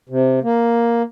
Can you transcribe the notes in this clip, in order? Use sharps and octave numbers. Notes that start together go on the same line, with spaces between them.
C3
A#3